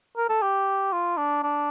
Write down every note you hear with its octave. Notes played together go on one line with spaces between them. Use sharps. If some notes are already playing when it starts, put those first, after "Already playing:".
A#4
A4
G4
F4
D4
D4